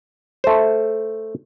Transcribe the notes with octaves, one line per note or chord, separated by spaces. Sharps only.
A3 C5